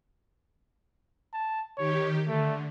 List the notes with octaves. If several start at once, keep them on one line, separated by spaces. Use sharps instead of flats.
A5
D#3 G4 C#5
D3 A3